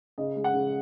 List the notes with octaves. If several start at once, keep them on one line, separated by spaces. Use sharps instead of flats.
C#3 D#5
G#3
F#5
C#3